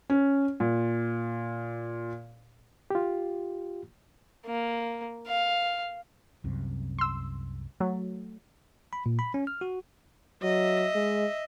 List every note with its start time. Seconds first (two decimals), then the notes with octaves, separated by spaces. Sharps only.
0.10 C#4
0.60 A#2
2.90 F4 G4
4.46 A#3
5.27 F5
6.44 C2 F#2 C3
6.99 C6 E6
7.80 F#3 A3
8.93 B5
9.06 A#2
9.19 B5
9.34 C#4
9.47 F6
9.61 F#4
10.42 F#3 D#5 E5
10.95 G#3